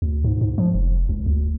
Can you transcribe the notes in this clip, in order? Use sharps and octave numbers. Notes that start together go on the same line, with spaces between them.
D2
G#2
G#2
F3
F1
C#2
D2